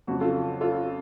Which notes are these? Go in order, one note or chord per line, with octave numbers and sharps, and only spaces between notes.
F2 C#3 F#3 F#4
F4 A4
F4 A4